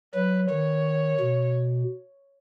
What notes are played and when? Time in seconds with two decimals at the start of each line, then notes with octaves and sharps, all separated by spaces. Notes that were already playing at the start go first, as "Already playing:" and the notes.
0.14 F#3 B4
0.50 D#3 C#5
1.20 B2